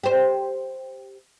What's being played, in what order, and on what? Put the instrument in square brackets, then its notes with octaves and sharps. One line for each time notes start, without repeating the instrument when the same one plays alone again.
[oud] G4 C5